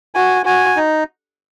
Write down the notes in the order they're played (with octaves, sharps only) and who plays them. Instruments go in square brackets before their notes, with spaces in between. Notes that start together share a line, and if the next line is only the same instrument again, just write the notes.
[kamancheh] F#4 [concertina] G#5
[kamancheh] F#4 [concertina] G#5
[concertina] D#4